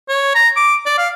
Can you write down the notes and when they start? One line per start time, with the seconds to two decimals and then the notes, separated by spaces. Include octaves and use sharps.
0.09 C#5
0.35 A#5
0.57 D6
0.86 D5
0.98 F5